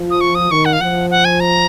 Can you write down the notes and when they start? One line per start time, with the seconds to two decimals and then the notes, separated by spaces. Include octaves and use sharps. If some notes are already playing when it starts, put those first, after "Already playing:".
Already playing: F3
0.10 D#6
0.21 C#6
0.35 D#6
0.50 D#3 C#6
0.65 F#5
0.73 F5
0.80 F3 F#5
1.10 F#5
1.25 G#5
1.40 A#5